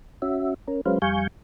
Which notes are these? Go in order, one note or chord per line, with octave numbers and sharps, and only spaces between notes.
C#4 F#4 E5
C#4 A#4
F#3 G#3 C#4 B4 C5 F5
F2 G3 F5 G#5 C#6 G6